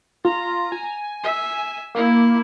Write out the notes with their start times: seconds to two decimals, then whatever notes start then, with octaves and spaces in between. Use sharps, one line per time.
0.25 F4 A#5
0.72 G#5
1.23 E5
1.95 A#3 E4